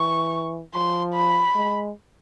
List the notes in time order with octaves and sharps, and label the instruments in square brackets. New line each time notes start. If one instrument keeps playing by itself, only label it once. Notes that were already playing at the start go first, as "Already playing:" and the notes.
Already playing: [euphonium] E3 [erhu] C#6
[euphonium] F3 [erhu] C6
[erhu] B5
[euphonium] G#3